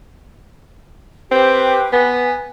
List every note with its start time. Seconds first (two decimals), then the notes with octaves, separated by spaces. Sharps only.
1.31 C4 G4 B4 G5
1.93 B3 G#5